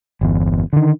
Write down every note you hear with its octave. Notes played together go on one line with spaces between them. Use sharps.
G1 E2
D3 D#3